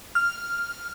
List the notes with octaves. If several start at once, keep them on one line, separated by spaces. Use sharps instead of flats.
F6